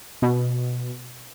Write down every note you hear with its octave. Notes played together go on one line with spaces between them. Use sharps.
B2